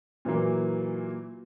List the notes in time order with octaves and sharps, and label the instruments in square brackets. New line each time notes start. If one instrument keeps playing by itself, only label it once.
[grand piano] A#2 E3 F#3 A#3